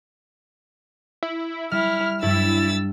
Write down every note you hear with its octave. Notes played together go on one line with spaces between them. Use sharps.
E4
G3 E4 F6
G2 G3 E4 E6 A6